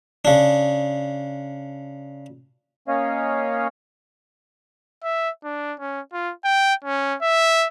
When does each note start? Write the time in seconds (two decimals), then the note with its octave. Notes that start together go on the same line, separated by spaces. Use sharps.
0.25 C#3 D4
2.88 A#3 C#4 C#5 D#5 F5
5.03 E5
5.44 D4
5.80 C#4
6.13 F4
6.44 G5
6.84 C#4
7.21 E5